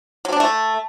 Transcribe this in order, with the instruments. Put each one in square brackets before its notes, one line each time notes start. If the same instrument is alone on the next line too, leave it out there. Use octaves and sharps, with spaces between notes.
[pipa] F#3
D4
A3